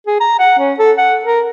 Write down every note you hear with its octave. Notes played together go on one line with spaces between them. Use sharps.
G#4
A#5
F#5
C#4
A4
F#5
A#4